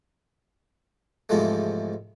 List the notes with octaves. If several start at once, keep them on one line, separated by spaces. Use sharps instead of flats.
E2 G#2 C3 F3 G#3 A3